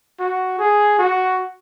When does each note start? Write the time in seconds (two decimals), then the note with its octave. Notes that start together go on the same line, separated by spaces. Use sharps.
0.20 F#4
0.59 G#4
0.99 F#4